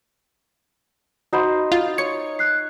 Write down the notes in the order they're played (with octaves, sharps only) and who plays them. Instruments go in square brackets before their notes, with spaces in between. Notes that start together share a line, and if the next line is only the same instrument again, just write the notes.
[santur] D#4 C5 [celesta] F#4 F#5 B5
[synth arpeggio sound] F4
[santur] C#5 [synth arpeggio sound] C#7
[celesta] F#6 C7